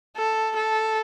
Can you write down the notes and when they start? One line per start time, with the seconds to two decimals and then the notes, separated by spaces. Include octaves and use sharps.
0.17 A4
0.56 A4